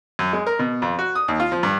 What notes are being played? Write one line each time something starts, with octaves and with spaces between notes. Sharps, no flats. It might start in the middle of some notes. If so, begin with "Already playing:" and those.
F#2
G#3
A#4
B2
F2
F#4
D#6
D#2
F4
F3
G2